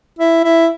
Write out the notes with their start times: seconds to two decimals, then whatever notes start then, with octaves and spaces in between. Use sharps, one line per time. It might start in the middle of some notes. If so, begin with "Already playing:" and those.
0.19 E4
0.44 E4